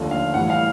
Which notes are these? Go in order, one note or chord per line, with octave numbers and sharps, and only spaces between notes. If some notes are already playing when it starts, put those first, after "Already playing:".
Already playing: D#2 D3 F3 A3
F5
A2 E3 G3 F#5
F5